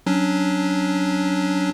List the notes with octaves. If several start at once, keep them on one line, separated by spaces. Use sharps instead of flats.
F#3 C#4 D4